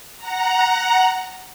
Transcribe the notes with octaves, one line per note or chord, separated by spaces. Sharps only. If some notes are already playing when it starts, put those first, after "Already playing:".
F#5 A#5